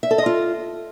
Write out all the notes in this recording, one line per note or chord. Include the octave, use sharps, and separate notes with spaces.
E5
A4
D#5
F4